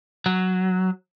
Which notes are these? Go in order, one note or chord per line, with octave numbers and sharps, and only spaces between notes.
F#3